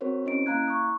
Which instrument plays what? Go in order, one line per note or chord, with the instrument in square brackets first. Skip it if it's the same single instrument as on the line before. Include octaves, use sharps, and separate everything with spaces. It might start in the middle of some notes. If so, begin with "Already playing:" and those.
[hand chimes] C4 F#4 A#4 C5 C#5
C#4 E4 D#5 D7
A#3 E4 F5 A#5 F#6 G#6
C#6 D#6